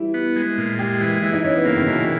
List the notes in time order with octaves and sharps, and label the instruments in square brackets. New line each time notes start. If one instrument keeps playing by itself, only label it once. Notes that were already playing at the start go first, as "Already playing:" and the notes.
Already playing: [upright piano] E3 G3 E4
[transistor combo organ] B3
G#3
A#2
[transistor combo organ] G#3 [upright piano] G4
[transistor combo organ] E3
[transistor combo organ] E3 [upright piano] E4
[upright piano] D#4
[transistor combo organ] E3 [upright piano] C#4
[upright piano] B3
[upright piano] C#3 [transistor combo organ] A#3
[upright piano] D#3
[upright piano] B2 [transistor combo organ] E3
[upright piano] A#2